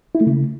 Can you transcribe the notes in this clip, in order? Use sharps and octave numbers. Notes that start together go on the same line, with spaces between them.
E4
A3
C#3